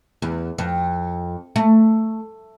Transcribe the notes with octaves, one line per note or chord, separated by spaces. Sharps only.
E2
F2
A3